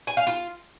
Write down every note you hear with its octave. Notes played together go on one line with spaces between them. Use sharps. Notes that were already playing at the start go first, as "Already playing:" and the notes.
G#5
F5
F4